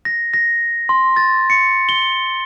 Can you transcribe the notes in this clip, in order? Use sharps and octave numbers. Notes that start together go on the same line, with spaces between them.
A#6
A#6
C6
A6
C#7
G7